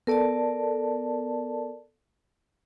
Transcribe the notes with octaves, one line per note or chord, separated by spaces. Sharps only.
B3 A4 A#4 D5 A5